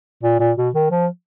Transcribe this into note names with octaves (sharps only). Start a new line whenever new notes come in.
A#2
A#2
B2
D#3
F3